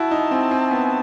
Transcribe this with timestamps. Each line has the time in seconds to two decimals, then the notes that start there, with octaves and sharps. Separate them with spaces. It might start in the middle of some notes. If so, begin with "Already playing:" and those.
Already playing: E4 F#4 A5
0.11 D#4
0.31 C4
0.51 C4
0.71 B3